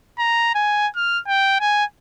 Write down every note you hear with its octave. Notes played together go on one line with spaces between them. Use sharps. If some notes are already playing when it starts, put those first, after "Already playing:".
A#5
G#5
F6
G5
G#5